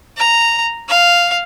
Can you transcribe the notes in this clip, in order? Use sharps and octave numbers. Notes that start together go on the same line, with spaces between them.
A#5
F5